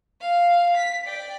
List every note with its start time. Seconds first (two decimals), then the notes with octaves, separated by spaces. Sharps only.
0.21 F5
0.77 B6
1.05 D5 G5